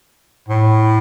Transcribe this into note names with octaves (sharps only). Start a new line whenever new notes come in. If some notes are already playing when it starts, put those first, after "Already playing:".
A2